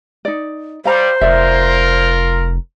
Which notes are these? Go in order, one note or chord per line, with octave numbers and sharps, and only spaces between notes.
D#4 D5
G3 C5 F5 A#5
F1 F4 A#4 D5 E5